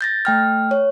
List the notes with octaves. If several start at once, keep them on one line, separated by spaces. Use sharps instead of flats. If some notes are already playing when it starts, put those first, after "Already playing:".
G6 A6 A#6
A3 G5 F6
C#5